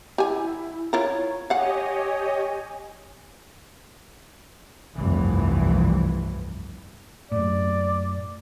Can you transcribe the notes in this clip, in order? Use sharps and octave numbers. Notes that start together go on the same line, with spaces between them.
E4 G4 G#5
E4 F4 A#4 C#5
G4 C#5 D#5 F5 F#5 G#5
F1 C2 G2 E3
F#2 A2 D5